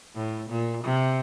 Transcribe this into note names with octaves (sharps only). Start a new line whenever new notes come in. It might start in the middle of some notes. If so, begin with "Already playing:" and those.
A2
A#2
C3